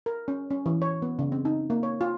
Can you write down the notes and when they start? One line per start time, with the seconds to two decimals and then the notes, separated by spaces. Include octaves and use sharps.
0.06 A#4
0.28 C#4
0.50 C#4
0.66 E3
0.82 C#5
1.02 B3
1.19 C#3
1.32 C4
1.45 D#4
1.70 A#3
1.83 C#5
2.01 F4